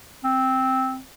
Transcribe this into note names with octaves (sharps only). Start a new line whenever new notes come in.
C4